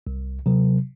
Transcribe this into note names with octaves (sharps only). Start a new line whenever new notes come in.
C2
C3 F#3